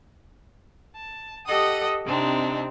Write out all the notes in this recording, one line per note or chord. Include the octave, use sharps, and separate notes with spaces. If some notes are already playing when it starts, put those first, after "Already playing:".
A5
G4 A4 D#5 F#5 D#6
C3 C4 D4 D#4